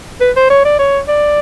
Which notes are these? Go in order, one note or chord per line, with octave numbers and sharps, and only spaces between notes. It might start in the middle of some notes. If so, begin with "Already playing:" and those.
B4
C5
C#5
D5
C#5
D5